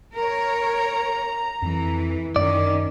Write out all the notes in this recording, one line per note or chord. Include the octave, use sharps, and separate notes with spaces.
A#4 C#5 A#5
F2 E3
F#2 D#3 C#4 D5